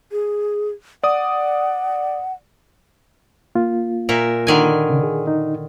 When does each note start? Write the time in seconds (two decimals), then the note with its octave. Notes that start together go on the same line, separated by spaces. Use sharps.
0.12 G#4
1.03 D5 F#5 D#6
3.55 A#3 F4
4.09 A#2 A#4 E5
4.47 D3 D#3 G#5
4.90 C#3
5.03 G#4
5.27 D#4